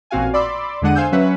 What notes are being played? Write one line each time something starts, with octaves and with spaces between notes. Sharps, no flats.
A1 A#2 C4 F#4 F5 G#5
D5 B5 C6 D6 E6
E2 D3 G#3 D4 F#5 D#7
C5 F5 G#5 E6 G6
F#3 C#4 B4 E5 F#5